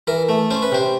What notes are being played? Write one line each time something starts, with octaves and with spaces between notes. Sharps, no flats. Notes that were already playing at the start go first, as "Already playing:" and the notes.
E3 A#4
A3
C#4 C5
B4
C3 C5